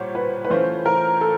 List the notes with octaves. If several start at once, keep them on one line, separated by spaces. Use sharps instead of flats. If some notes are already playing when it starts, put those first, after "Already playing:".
Already playing: A#2 G3 C5 C#5 F#5
B4
B4
E3 A3 C#4 F4 C5
A#4
A4